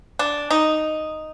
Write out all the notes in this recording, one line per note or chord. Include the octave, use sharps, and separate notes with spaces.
D4
D#4